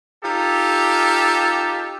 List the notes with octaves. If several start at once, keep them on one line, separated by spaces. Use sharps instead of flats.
D#4 F4 G4 A4